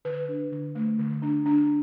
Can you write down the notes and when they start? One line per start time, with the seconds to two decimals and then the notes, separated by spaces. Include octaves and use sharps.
0.05 D3 B4
0.29 D4
0.52 D3
0.75 A3
0.99 D3
1.22 D4
1.46 D4